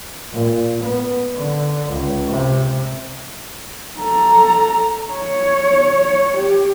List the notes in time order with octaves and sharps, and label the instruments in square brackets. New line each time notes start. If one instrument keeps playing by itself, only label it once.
[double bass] A#2
B3
D3
C#2
C3
[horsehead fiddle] A4 A#5
C#5
G4